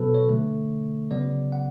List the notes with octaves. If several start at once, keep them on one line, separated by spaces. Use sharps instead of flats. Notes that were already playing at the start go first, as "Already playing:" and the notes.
Already playing: B2 F#3 B3 A4 B4
C#5
D3 A3
C#3 F#3 B3 D5
F#5